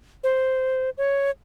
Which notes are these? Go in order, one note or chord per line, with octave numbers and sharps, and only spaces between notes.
C5
C#5